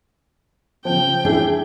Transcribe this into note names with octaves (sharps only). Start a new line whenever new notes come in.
C#3 F3 G5
D4 E4 G#4